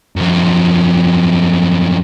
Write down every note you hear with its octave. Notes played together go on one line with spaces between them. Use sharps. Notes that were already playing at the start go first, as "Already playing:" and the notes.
F#2 F3